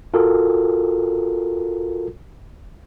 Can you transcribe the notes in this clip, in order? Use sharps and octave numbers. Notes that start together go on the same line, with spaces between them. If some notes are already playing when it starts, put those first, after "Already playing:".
F4 F#4 A4 A#4